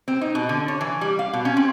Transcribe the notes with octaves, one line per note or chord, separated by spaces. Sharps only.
C4
D#4
B2
D3
C#5
E3
G3
F5
B2
C#4
C4